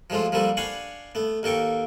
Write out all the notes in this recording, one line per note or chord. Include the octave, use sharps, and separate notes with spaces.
F3 F#3 G#3 A3 F4
F3 G3 A#3 A4 B4
D4 F5 F#5 G#5 B5 C#6
A3 B3
D#2 A#3 A4 G5 C#6